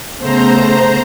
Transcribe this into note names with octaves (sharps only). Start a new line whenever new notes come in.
C#3 A3 B3 C5 A#5